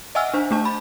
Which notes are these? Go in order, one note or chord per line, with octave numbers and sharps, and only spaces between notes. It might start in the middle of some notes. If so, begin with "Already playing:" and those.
D#5 E5 F#5 G#5 E6 F6
D4 C5
A3 D4 A5
B5